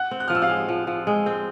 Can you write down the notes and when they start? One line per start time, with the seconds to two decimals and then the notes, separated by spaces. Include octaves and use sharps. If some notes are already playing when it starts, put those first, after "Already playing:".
Already playing: F#5 F#6
0.11 C4
0.20 F#6
0.28 F3 F6
0.35 E6
0.42 F5 F6
0.49 G#3
0.69 F3
0.87 F3
1.07 G#3
1.26 C4